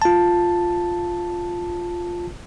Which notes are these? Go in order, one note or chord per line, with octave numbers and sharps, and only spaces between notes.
F4 A5